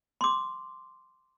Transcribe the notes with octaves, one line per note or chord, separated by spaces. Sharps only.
C6 D6